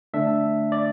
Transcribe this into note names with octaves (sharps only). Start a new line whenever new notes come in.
D3 A3 D4 E5
D5